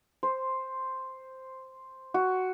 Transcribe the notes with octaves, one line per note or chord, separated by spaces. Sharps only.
C5
F#4